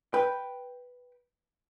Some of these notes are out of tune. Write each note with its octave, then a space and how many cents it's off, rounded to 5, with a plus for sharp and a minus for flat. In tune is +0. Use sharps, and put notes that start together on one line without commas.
B4 +0 G5 +0